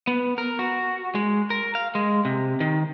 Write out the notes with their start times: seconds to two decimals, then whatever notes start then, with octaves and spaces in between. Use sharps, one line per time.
0.07 B3
0.38 A#4
0.59 F#4
1.15 G#3
1.50 A#4
1.75 F5
1.95 G#3
2.25 C3
2.60 D#3